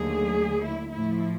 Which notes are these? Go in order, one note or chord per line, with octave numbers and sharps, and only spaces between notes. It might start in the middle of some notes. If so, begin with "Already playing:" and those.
Already playing: D#2 D3 F#3 A3 G#4
E4
A2 F3 A3 E4